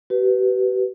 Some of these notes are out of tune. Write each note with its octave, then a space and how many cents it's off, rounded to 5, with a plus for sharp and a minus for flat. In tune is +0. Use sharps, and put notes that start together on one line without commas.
G4 -45 B4 +0